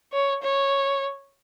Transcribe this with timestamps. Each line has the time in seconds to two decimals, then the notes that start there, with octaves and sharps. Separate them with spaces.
0.13 C#5
0.42 C#5